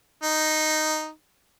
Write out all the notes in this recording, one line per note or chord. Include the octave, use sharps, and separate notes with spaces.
D#4